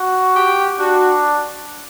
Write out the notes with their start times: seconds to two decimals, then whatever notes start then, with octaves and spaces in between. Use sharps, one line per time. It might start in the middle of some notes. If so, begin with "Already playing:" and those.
Already playing: F#4
0.35 G4
0.79 D4 F#4